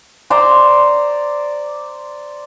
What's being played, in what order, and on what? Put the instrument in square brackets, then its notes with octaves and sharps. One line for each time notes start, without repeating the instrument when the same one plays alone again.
[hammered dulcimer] C5 D5 A#5 C6